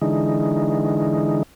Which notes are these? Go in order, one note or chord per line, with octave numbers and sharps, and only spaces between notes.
D3 E3 G#3 D#4